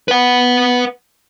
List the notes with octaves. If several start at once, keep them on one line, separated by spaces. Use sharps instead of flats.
B4 F#5